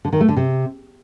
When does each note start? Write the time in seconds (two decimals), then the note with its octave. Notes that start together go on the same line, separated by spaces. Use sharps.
0.05 D3
0.13 D#3
0.21 A3
0.29 D3
0.37 C3